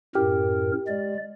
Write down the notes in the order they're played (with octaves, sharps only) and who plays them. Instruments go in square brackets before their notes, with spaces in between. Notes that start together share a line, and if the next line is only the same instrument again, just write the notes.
[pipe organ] F#2 A2 A#4 [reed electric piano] G4
[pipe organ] G#3 D5